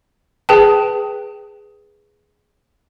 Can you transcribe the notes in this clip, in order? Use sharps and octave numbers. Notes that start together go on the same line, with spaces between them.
G#4 B4 G5 A5